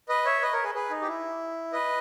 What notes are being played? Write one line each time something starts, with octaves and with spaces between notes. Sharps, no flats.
B4 D#5
C#5 E5
B4 D#5
A#4 C#5
G#4 B4
G#4 B4
D#4
G4
E4
B4 D#5